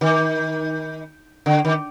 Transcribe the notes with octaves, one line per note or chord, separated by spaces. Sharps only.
D#3
D3
D#3